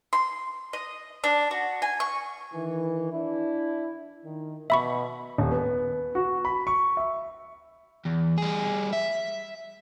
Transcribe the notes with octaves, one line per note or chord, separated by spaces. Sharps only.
C6
D#5
D4
F#4
G#5
C#6
D#3 E3
D4 E4
D#3
B2 E5 B5 C#6
D#1
B3
F#4
B5
C#6
E5
E2
G3 G#4
E5